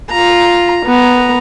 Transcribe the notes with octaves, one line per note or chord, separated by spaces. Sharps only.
F4 A#5
B3 A#5